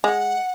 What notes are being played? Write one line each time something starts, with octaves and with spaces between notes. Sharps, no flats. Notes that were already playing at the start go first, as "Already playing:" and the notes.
G#3 F#5